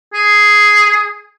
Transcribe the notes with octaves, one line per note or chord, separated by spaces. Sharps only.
G#4